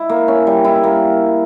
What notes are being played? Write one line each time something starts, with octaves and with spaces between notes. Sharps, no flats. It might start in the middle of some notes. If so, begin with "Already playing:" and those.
Already playing: E4
A#3
C#4
G3
E4
A#3